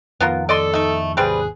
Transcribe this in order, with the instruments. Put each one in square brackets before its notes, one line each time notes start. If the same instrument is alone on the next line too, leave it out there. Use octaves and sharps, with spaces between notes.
[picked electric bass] F2 D#3 [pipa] B3 F4 A#4
[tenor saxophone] A4 [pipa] D5 D#5 C6
[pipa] A3 D#4
[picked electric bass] G#1 D#2 [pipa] G3 C4 B4 [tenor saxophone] G#4